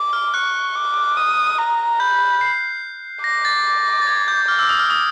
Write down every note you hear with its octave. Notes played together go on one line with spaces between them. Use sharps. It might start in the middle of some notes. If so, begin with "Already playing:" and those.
Already playing: D6
F6
C#6 F#6
D6
D#6
A#5
B5 G6
C7
D6 A#6
A6
A6
G#6
G6
D6 F6
E6
D#6
F6
D#6